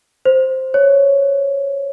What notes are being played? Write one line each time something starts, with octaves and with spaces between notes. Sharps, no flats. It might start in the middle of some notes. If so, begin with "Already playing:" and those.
C5
C#5